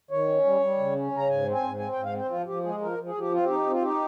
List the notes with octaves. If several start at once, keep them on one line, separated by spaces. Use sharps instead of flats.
D#3 C#5
C#4
G3
G3
C#3
C#4
C#3
A#5
G#2 G#5
C4
G#5
G#2
C4 G#5
G#2 G5
F5
C4 C5
F3 F4
F3 G4
G#3 G#4
F3 A#4
F3
G#4
F3 G4
C4 F4
D#4 G4
C4
F4
D#4 G4